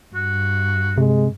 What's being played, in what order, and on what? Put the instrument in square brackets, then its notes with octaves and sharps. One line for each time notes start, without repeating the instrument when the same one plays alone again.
[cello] G2 [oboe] F#4
[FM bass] C3 [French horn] G#3